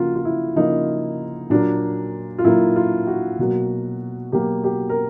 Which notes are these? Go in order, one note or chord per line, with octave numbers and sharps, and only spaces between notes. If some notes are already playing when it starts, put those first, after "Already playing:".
Already playing: C#3 F3 A#3 F4 F#4
F4
E4
C#3 F3 A#3 D#4
A#2 F#3 A#3 D4
F4
A#2 F#3 A#3 E4
F4
F#4
B2 F#3 A#3
B2 F#3 A#3 G4
G4
A#4